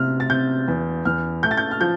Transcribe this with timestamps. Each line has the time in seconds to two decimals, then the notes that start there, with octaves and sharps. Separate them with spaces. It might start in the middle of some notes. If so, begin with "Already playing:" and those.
Already playing: C3 F6
0.20 A6
0.30 C3 G6
0.68 E2
1.05 E2 F6
1.43 A3 G6
1.51 A6
1.57 G6
1.71 F6
1.81 F3 G6